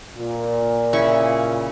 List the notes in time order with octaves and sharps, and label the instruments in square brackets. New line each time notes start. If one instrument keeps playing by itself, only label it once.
[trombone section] A#2
[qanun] C#3 E4 C#6